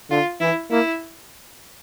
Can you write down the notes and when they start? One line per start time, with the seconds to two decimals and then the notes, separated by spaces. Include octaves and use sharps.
0.10 D3 F4
0.40 E3 E4
0.71 A#3 E4